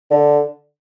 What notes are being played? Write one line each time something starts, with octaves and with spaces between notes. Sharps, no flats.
D3